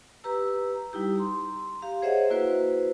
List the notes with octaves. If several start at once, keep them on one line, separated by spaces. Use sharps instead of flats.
G4 B4 A#5 E6
G3 D#4 E4 G4
A#5 C6
G4 F5
G#4 C5 C#5 D#5 E5 F#5
A#3 E4 F#4 B4 C5